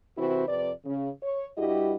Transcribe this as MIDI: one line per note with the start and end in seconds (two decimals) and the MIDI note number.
0.17 0.45 48
0.17 0.45 52
0.17 0.45 60
0.17 0.45 64
0.17 0.45 66
0.17 0.45 72
0.48 0.71 41
0.48 0.71 48
0.48 0.71 71
0.48 0.71 74
0.85 1.08 49
1.22 1.47 73
1.58 1.96 43
1.58 1.96 55
1.58 1.96 64
1.58 1.96 66
1.58 1.96 67
1.58 1.96 75